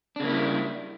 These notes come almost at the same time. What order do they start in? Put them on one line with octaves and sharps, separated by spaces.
D4 C#3 A#3 E4 G3